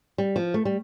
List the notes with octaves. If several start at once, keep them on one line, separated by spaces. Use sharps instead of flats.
G3
F3
A3
G3